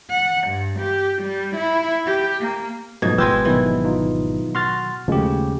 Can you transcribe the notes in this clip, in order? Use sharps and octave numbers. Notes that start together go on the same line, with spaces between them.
F#5
G2
G4
G3
E4
G4
A#3
G#2 B2 F3 F#3 A3 D#5 G#6
G#1 F3 G#3 F4 G4 B4 E6 G#6
B2 D#3 E3 F#3 E4
D#4 F4
F#4 C6 F6 A6
D#2 C#3 F3 G#3 A3 G4